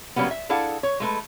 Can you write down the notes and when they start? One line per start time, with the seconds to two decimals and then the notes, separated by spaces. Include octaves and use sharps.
0.16 C#3 F#3 G3 A#3 B3
0.31 E5
0.49 D4 E4 G#4 A4 F5 F#5
0.83 C#5
1.00 G#3 A3 B4